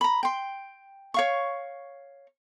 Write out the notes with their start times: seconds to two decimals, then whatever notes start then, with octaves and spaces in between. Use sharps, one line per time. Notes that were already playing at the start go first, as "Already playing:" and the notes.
0.01 A#5 B5
0.23 G5 C6
1.14 C#5 F5 C#6